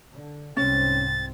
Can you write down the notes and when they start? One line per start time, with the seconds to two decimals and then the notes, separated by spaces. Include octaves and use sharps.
0.13 D3
0.57 C2 G#2 C4 C#4 A6